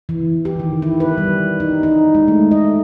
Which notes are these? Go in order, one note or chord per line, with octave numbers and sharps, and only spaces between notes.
E3
G4
D#3
E4
B4
G3
D#4
D#4
G#3
A3
D#5